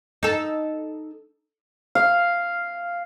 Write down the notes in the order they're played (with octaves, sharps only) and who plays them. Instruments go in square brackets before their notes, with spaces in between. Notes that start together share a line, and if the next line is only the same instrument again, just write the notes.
[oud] D#4 A4
[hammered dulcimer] F5